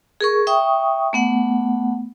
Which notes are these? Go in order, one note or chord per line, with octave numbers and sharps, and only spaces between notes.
G#4 A#4 C#6
E5 G5 C#6 D#6
A3 B3 F#5